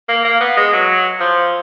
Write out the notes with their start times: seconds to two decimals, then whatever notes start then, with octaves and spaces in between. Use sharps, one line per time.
0.08 A#3
0.25 A#3
0.40 B3
0.57 G#3
0.72 F#3
1.20 F3